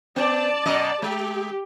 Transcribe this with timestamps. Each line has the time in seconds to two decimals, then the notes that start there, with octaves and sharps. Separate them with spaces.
0.16 B3 D5 A5
0.66 F#2 B2 D#5
1.02 G#3 G4